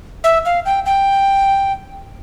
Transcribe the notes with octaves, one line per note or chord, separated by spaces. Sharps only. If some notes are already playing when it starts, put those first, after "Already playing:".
E5
F5
G5
G5